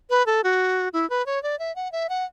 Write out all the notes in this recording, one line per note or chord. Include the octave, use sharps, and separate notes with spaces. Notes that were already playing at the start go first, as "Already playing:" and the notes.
B4
A4
F#4
E4
B4
C#5
D5
E5
F#5
E5
F#5